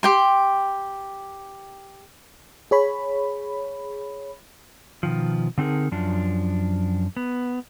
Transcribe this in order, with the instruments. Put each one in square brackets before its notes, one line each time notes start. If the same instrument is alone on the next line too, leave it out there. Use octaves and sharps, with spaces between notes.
[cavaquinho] G4 G5 C6
[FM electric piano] G#4 C#5 B5
[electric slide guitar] B2 D#3 F3
D3 C4 D#4 G#4 A#4
F#2 F3 D4
B3